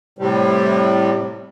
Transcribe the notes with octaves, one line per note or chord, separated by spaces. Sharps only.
A2 C3 G3